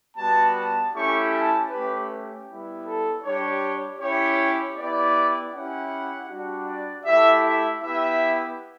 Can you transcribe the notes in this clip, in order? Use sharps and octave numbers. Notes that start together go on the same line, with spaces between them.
G3 B3 F#4 A5
A5
A3 C#4 E4 G4 C#6
A5
A3 C#4 G4 B4
G4
G3 B3 E4
A4
G3 D4 G4 C#5
C#4 E4 G4 C#5
B3 E4 G4 D5
C#4 E4 G4 F#5
G3 D4 F#4
D5
A3 E4 G4 E5
E5
B3 E4 G4 E5